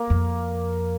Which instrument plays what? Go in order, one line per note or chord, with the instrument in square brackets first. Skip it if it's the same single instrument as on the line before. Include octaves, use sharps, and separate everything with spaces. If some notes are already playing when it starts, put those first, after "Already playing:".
Already playing: [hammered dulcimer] A#3
[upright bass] F2